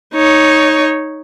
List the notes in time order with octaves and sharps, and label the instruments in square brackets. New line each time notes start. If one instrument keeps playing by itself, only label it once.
[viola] D#4 C#5